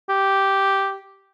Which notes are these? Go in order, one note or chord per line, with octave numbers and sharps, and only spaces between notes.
G4